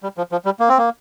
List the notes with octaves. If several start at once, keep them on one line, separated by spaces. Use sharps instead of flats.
G3
F3
F3
G3
A#3
C4
A#3